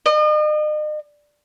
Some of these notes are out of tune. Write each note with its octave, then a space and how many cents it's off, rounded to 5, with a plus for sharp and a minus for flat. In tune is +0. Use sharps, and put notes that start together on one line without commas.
D#5 -40